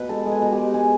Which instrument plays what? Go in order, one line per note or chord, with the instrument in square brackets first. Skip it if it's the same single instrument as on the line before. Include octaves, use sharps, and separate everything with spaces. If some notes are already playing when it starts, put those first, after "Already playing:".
Already playing: [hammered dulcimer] B2 B4
G#3 A4
G#3
G#4
B2
G4
G#3
G#3 G#4